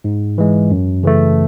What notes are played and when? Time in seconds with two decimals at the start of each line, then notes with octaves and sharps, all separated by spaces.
0.04 G#2
0.38 E3 G#3
0.71 F#2
1.03 C#3 E3 A3